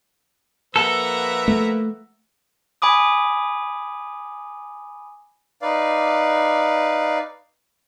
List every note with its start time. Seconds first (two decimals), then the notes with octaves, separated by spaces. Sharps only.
0.76 F3 A#3 A4 B4 E5 F#5 A#5
1.48 A3
2.82 G#5 B5 D6 D#6
5.61 D#4 B4 D5 F5